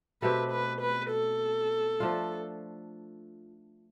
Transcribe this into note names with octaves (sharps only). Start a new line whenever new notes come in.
B2 A3 C4 G4 B4
B4
B4
A4
F3 A3 D4 F4